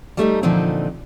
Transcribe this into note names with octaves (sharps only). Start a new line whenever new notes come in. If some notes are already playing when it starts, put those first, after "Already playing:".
G3 A3 D4 D#4
A#2 D3 E3 F3 C4 D#4